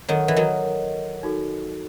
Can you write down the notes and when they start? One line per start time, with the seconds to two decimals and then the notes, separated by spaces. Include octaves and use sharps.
0.08 D#3 F#3 A4 D#5 F#5
0.28 E3
0.36 D#3 F#3
1.23 D#4 F#4 A4